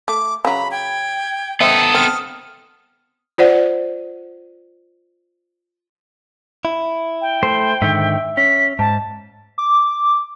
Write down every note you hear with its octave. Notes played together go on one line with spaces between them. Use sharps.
A3 D6
C#3 F#3 A#5 B5
G5 G#6
B3 A4 C5 D#5 E5 G5 D#6
C4 F6
F4 C5 D5 F#5
E4
G5
A3 C5
G#2 D3 D#3 E5
C#4 B6
G#2 A5
D6